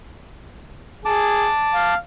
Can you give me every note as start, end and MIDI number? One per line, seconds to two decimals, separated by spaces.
1.05 1.49 68
1.05 1.94 81
1.05 1.94 86
1.74 1.97 77